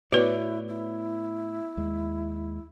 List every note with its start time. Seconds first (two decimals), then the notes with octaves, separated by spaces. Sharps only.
0.12 A2 B3 E4 F#4 B4 C#5 D5
0.69 E4
1.77 D#2 G#3